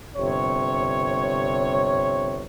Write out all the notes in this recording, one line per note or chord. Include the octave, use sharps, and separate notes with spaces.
G1 C3 C#5